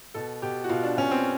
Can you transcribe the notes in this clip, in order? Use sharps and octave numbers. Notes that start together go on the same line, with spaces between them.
B2 A4
B2 G4
F#4
B2 F4
D4
B2 C#4
C4